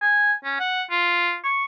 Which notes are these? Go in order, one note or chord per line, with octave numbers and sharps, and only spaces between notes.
G#5
C#4
F#5
F4
C#6